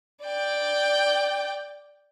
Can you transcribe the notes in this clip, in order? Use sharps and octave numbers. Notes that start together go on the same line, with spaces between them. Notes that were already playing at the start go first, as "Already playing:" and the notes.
D5 G5